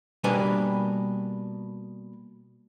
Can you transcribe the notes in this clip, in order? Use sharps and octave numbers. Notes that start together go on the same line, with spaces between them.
B2 G3 A#3 D4 B4 G#5